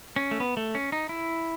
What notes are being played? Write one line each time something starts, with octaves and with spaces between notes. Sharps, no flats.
C#4
A3
B3
A3
C#4
D#4
E4